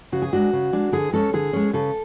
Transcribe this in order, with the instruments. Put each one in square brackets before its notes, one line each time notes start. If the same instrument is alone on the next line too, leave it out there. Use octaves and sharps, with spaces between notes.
[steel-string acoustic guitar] C#3 F#4
G#4
G#3 D4 F#4
C#3
G#3 D4
D3 G#4
G#3 C#4 A4
D3 G#4
G#3 C#4
C#3 A4